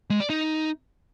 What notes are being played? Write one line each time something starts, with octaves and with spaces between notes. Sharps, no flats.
G#3
D5
D#4